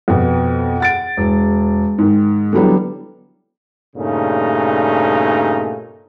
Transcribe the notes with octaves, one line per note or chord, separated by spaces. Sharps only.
F2 B2
F#5 A6 D7
E1
G#2 D#3
D3 E3 F#3 G3 B3 D4
G2 A#2 C#3 A3 D#4